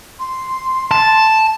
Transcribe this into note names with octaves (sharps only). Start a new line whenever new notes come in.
C6
A5